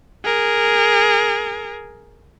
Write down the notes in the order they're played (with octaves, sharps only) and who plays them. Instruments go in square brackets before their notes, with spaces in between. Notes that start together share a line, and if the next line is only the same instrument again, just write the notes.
[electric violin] G#4 A#4